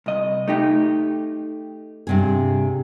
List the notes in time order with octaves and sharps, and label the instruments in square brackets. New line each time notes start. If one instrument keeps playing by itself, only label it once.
[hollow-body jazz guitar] C2 D#5
A3 D#4 G4
[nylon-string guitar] G2 C3 G#4